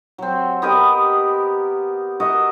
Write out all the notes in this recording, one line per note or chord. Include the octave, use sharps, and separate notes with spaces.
F#3 C4
B3 G4 A#4 D#5
F#4 A#4 D#5 E5